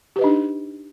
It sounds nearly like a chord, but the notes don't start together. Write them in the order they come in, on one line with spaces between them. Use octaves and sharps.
G4 B4 D#5 D4 D#4